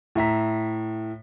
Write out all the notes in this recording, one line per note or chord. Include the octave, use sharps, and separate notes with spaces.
A2 E5 A#5 B6